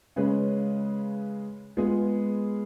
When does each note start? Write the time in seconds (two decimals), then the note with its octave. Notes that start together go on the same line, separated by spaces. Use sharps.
0.16 C#3 G#3 C#4 G#4 B4
1.77 G#3 B3 F4 G#4